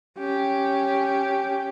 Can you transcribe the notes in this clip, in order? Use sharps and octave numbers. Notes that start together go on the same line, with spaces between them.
C#4 G4